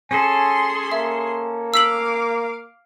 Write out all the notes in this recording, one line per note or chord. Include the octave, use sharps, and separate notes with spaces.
C#4 G#4 A4 G#5 C6
A#3 E5
F5 D6 E6 B6 F#7